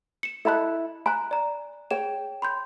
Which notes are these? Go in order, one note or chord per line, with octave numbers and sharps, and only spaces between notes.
C#7 E7
E4 A4 D#5 A5 B5 F#6
G#5 A#5 B5 F#6
D5 A#5
G#4 C#5 G5 E7
B5 C6 G6